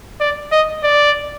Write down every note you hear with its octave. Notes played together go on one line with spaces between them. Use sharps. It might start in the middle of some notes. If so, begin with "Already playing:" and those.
D5
D#5
D5